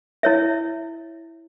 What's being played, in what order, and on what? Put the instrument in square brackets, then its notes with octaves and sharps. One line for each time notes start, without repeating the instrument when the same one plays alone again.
[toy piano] E4 C#5 E5